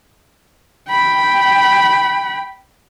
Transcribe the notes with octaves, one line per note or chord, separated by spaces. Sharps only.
G5 B5